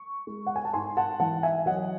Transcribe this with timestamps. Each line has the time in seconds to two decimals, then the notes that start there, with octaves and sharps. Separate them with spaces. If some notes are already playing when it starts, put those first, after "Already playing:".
Already playing: C#6
0.27 G#3
0.47 F#5
0.56 G#5
0.65 A5
0.73 G#2 G#5 C6
0.97 F#5 A5
1.20 E3 F#5 A5
1.43 E5 G#5
1.66 F#3 D#5 F#5